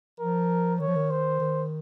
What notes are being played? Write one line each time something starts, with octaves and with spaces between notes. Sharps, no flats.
F3 A#4
D#3 C#5
F3
D#3
C5
D#3